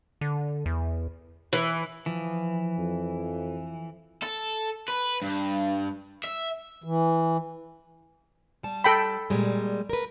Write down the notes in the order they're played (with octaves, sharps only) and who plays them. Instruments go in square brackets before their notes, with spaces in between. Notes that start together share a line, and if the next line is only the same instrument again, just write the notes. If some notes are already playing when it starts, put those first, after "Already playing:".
[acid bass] D3
E2
[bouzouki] E3
[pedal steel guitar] E3 [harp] F3
[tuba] F2
[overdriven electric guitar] A4
B4
G2
E5
[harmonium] E3
[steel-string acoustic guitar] G3 A5
[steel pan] A4 G5 B5
[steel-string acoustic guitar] A#2 G3 G#3
A#4 B4